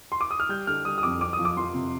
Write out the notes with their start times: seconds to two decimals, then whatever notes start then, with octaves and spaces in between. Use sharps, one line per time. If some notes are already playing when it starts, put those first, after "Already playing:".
0.12 C6
0.21 D6
0.31 D#6
0.40 F6
0.49 G3 G6
0.67 D3 F6
0.85 G3 D#6
0.98 D#6
1.03 F2 D6
1.21 C4 D6
1.33 D#6
1.39 F3
1.45 D6
1.57 F3 C6
1.74 C3